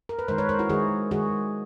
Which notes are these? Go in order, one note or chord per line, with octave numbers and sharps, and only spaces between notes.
A#4
B4
D#3 G#3 A#4 C5
B4 C#5
A#4 C5
E4 F#4
D#3 G#3 F#4 G#4
D#3 G#3 F#4 G#4